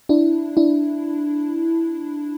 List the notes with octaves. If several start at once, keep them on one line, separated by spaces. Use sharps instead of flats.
D4 E4
D4 E4